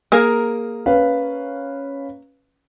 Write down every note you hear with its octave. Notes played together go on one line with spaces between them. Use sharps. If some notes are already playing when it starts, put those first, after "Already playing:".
A#3 G#4 A#4
C#4 B4 F5